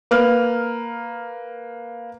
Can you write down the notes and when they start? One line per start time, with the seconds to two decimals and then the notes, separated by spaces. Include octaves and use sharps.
0.11 A#3 B4 F6